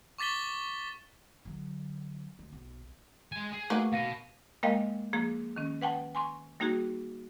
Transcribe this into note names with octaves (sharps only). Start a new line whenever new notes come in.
C#6 D6 A6 B6 G7
D3 F#3
D2
B1
G#3 G#5
G#4
A3 A#3 D#4 F#4 B4
B2 F5 A#6 D#7
G#3 A#3 A#4 D#5 F5 G5
F3 A#3 G#4
D#3 C#4
B4 F#5 G5 A5
G#5 C6 C#6
G3 A#3 D#4 F#4 G#4